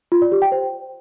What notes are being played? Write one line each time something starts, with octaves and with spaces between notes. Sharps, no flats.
F4
D5
G4
G5
C5